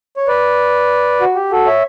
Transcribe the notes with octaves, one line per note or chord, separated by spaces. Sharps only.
C#5
B4 D5
F#4
G4
F#4 A4
C#5 E5